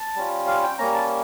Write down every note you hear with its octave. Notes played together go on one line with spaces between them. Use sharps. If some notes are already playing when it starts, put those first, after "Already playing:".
Already playing: A5
G3 C#4 F4
F5
G5
G3 A#3 C#4 A#5
A5